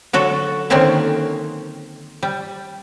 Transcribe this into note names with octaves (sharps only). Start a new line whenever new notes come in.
D3 F#3 F#4 A4
D3 D#3 F#3 A#3 C4 C#4
G3